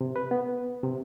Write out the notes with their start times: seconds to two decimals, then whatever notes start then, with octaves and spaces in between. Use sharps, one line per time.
0.01 C3
0.16 B4
0.31 B3
0.84 C3